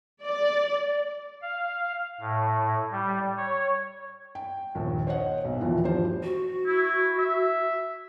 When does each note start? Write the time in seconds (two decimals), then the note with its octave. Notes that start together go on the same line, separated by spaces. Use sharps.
0.23 D5
1.42 F5
2.20 A2
2.92 G3
3.37 C#5
4.35 G5
4.75 A#1 D#2
5.07 C5 C#5 D#5 F#5
5.45 B1
5.61 D#2 A#2 E3 F3
5.84 G2 F3 F#4 G4 C5
6.23 F#4
6.67 E4
7.19 E5